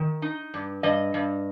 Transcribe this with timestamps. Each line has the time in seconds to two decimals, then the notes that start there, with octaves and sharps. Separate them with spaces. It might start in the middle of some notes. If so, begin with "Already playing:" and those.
Already playing: D#3
0.22 D#4
0.54 G2
0.83 G2 D#5
1.14 G2